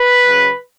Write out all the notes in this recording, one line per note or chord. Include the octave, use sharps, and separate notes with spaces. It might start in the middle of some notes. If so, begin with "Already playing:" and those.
Already playing: B4
C#3 F#3